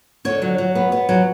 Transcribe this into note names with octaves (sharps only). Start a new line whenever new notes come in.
D3 C#5
F#3
F#3
B3
B3
F#3